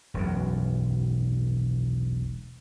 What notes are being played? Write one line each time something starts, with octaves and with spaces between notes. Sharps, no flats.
E1 B1 F#2